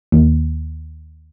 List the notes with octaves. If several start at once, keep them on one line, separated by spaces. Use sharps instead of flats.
D#2